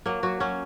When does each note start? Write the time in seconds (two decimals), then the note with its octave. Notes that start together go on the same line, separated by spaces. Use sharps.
0.06 F#3 A#3
0.23 F#3 F#4
0.40 F#3 C#4